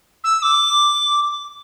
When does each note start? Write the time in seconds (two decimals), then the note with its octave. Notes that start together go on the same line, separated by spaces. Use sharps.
0.24 E6
0.42 D6